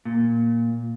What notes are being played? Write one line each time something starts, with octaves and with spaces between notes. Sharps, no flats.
A#2